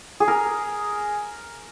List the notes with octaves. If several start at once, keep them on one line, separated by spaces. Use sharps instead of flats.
G#4
A#4